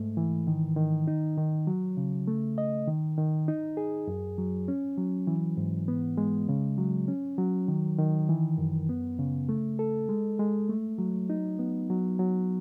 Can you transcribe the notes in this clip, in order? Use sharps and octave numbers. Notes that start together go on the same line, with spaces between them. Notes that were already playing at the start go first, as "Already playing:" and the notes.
Already playing: G#2 A3
E3
D#3
D#3
D#4
D#3
F#3
C#3
A3
D#5
D#3
D#3
D#4
G#4
F#2
F#3
C#4
F#3
E3
G#2
B3
G#3
C#3
F#3
C#4
F#3
D#3
D#3
E3
F#2
B3
C#3
A3
A4
G#3
G#3
A3
F#3
D#4
B3
F#3
F#3